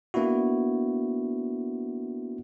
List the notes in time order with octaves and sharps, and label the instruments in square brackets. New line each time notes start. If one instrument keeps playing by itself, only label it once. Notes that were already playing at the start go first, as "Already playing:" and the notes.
[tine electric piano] A#3 B3 D4 E4 F#4